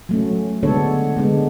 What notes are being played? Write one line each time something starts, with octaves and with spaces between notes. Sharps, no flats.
F#3 A3 C#4
D3 G#3 B3 D4 A4 C#5
D3 G#3 B3 D4